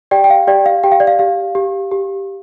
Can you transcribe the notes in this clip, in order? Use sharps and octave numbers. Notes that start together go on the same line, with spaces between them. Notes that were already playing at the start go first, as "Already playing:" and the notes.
G4 D5 G5
G5
F5
G4 D5 G5
F5
G4 G5
F5
D5
F5
G4 F5
G4
G4